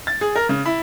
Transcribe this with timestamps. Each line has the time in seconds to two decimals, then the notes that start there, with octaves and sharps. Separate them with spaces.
0.07 A6
0.21 G#4
0.36 A#4
0.49 C#3
0.66 E4